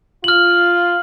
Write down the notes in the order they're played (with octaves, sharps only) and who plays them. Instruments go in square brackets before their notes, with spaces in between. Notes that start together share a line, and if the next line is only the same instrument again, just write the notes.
[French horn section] F4 [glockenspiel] F6 F#7